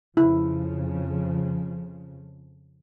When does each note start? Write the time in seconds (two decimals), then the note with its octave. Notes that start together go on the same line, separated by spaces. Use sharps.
0.17 F2 C#3 F3 E4